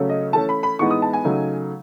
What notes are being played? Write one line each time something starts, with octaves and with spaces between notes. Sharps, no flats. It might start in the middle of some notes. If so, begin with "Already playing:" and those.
Already playing: C#3 F#3 A3 C#4
D#5
E3 A3 C#4 A5
B5
B5
A2 E3 G#3 B3 D#4 C#6
D#6
A5
G#5
C#3 F#3 A3 D#4